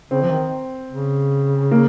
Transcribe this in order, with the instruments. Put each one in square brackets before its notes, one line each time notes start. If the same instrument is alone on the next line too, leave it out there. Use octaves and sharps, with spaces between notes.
[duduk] C#3 [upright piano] C4
[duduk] F3
D#3
C#3
[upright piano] A#3